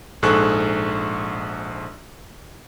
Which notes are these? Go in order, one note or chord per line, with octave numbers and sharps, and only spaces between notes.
A#1 G#2 G#4 A4 C#6 F#6